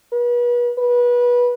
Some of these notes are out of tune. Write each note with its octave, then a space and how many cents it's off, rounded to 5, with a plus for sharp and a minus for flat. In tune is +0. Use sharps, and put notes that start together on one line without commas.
B4 -35
B4 -25